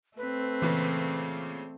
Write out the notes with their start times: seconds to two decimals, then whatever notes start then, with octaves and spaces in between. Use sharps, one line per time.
0.17 A3 C4 B4
0.62 A#2 C#3 E3